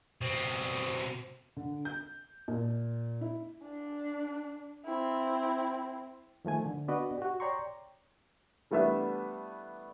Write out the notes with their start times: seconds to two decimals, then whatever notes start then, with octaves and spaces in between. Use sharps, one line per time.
0.21 B2 C4
1.57 D3
1.85 G6
2.48 A#2
3.21 E4
3.63 D4
4.85 C4 E4
6.45 D#3 F3 A3 G#5
6.66 D3
6.88 B3 D4 F#4 B4 D5 D#5
7.18 F#4 G4
7.40 C#5 D5 G5 A#5 C6 C#6
8.71 E3 G3 A3 B3 D4 E5